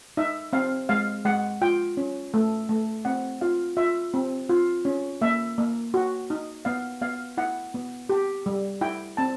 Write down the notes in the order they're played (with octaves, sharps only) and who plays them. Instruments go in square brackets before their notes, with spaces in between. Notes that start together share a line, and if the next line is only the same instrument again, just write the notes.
[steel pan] D#4 E5
C4 F5
G#3 F5
G#3 F#5
F4 G5
C#4
A3
A3
C4 F#5
F4 F5
F4 E5
C4
F4
C#4
A#3 E5
A#3
F#4
D#4
B3 F5
B3 F5
E4 F#5
B3
G4
G3
E4 G5
C4 A5